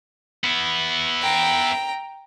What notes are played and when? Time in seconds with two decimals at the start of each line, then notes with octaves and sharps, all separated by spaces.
0.44 B3 E4
1.21 G5 A#5